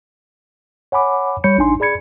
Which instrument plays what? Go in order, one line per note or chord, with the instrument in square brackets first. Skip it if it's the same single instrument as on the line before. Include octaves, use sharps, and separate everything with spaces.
[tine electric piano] C#5 F#5 G#5 B5 D6
G3 C#5 B5 G6 C#7
A1 D4 D#4 G#5 C6
G#4 D5 B5 G#6 C#7